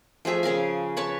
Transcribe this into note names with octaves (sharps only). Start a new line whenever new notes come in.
F3 A3 G#4 E5
C#3 G#4 A#4 F5
B4 C#5 A5